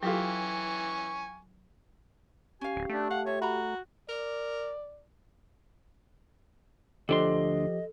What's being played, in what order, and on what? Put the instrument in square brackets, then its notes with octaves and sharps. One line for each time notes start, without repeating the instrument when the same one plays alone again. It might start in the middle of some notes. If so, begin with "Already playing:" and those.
[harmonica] E3 G#5 C#6 [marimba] F#3 A4 [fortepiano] F4 G4
[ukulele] C#4 F5 [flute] G4 [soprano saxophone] G#5
[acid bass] D1
[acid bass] A3 [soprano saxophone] D4
[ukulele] F5 [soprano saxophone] F#5
[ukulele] F4 E5 [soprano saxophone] C#5
[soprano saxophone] F#4 [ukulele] A#5 B5
[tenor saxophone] A#4 [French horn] D5
[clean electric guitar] D2 D4 C6 [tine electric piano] F3 G4 [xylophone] A4 [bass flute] D#5